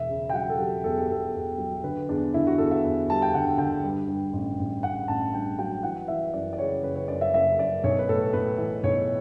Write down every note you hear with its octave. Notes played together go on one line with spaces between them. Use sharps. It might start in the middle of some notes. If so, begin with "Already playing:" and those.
Already playing: E1 E5
C#3
G5
F#3 F#5
A4
F#3 G4
E2 A4
G4
E2 A4
E2
F#3
D3 B4
E2 D4
D3 E4
F#4
E2 A4
E5
E2
G3 A5
G5
D3 F#5
D3 G5
G2
G2
A1
A1
A1 F#5
A1 A5
G2 G5
F#3 G5
E3 F#5
E3 E5
F#2 D5
D5
C#3 C#5
F#1 B4
C#5
F#2 D5
E5
F#1 E5
F#2 D5
B1 C#5
B4
A2 A4
A2 B4
E3
B1 C#5